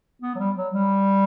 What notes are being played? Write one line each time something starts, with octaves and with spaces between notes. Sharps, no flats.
B3
F#3
G3
F#3
G3